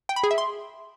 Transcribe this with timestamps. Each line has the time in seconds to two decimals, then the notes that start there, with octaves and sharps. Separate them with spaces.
0.09 G5
0.16 B5
0.24 G#4
0.31 E5
0.38 C6